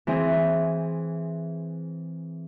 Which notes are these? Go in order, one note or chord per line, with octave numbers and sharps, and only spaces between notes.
E3 C4 G#4